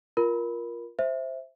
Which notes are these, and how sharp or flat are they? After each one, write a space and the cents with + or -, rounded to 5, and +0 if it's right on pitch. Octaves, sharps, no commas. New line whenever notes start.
F4 +0 A#4 +15 B5 +0
C5 +0 E5 +0